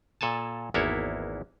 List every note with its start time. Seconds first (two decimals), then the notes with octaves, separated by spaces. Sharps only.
0.21 A#2 A4 G#5 A5
0.74 G#1 E2 A#3 B3 E4 C#5